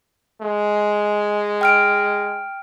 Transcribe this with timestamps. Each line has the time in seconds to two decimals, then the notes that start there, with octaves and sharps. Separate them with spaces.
0.41 G#3
1.61 G5 F6 D7